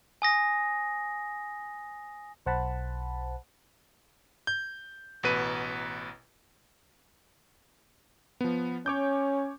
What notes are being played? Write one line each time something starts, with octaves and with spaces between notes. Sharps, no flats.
G#5 D#6 A#6
B1 C5 F#5 A5 B5
G6
A1 B2 B4 D#7
F3 B3
C#4 C#5 D6 G6